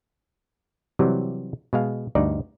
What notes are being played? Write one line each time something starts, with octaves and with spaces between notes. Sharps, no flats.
C3 E3 F#3 G3
B2 G#3 F5
D2 G2 D#4 D5